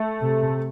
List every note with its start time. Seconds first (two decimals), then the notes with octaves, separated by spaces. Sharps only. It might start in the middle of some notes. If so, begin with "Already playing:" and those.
Already playing: A3
0.21 C3